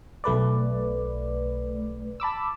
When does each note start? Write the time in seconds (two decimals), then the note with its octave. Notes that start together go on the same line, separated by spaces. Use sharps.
0.24 B1 A3 B4 D5
2.20 A5 B5 D6 E6